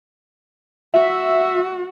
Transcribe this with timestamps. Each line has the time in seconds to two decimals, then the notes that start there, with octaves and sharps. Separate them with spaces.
0.94 F#4 E5